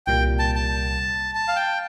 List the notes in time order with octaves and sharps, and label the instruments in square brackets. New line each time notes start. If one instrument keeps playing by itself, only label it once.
[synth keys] C2 A#2 G3 A#3 [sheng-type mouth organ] G5
[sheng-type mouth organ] A5
A5
A5
F5
G5